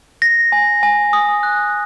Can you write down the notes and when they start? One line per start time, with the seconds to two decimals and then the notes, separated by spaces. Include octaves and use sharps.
0.22 A#6
0.52 G#5
0.83 G#5
1.13 D#6
1.43 F#6